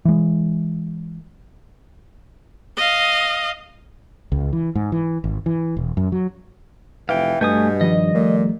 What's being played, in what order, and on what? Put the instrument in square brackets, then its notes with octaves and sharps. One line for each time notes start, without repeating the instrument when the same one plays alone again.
[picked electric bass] E3 G#3
[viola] D#5 F5
[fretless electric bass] C#2
E3
G#2
E3
G#1
E3
E1
F#2
F#3
[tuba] F1 [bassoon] E3 [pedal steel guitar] F5 G5
[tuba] G2 [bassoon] B2 [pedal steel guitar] A3 G#5 D#6 [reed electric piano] G6
[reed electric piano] D#3 F3 G3 [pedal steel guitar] D#5
[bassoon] A#2 [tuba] A3